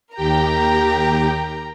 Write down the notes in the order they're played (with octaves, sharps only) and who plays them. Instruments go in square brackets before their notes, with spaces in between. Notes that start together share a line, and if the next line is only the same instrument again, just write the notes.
[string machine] D#2 G4 G5 [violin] A#4 A#5